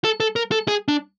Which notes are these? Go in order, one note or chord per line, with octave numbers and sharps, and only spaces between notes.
A4
A4
A#4
A4
G#4
D4